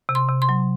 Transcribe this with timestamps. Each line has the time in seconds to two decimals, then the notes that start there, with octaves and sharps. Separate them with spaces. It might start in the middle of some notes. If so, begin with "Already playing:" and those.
0.09 C3
0.15 C6
0.29 C3
0.42 C6
0.49 F#3